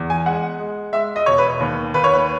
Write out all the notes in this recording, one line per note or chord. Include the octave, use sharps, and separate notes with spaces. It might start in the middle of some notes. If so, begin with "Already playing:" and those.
Already playing: E2
G#5
G#3 F#5
G#3
G#3 E5
D#5
E1 C#5
B4
D#2
D#2 B4
C#5
B4